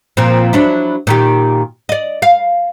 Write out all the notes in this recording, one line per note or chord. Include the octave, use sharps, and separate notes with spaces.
A#2 F3 C4
F#3 D4 E4
A#2 D#3 G4
D5 D#5
F5